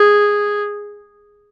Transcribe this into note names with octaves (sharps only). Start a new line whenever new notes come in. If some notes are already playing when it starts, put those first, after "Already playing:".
Already playing: G#4